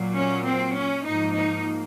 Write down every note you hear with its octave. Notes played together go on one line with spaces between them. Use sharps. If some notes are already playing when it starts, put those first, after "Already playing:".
Already playing: A#2 F#3 A#3
C#4
C4
C#4
G#2 F3 A#3 D#4
D#4